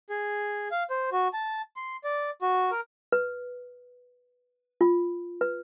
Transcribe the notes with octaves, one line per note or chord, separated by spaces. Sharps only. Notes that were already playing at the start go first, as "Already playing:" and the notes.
G#4
F5
C5
F#4
A5
C6
D5
F#4
A#4
B4
F4
B4